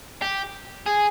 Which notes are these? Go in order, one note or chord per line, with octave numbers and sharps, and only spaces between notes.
G4
G#4